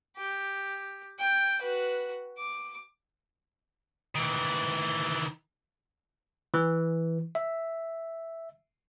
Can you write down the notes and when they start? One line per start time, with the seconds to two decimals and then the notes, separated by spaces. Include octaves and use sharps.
0.18 G4
1.19 G5
1.61 F#4 B4
2.38 D6
4.15 D#3 E3
6.54 E3
7.35 E5